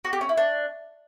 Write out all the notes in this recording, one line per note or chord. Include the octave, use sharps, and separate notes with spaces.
F#4
G4
C#4
E4
D4